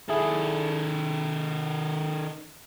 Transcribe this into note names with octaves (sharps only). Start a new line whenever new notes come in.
D#3 E4 G#4 A4